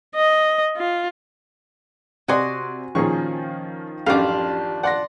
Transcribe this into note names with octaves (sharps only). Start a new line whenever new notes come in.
D#5
F4
C3 F#4 D5 D#5 G#5 C6
A#2 D#3 F3 C#4 G#4 C#6
A1 F#2 D4 F4 G4 F5 D6
D5 F#5 C6 A#6